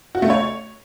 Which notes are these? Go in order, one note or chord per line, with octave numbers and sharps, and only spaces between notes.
F#4
A3
C#5